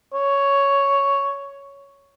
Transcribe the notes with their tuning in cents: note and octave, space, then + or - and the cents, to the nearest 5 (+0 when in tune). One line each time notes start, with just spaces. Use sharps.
C#5 +5